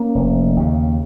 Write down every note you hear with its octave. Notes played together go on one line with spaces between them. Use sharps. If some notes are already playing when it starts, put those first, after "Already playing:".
Already playing: A#3 C#4
F1
D#2 C#3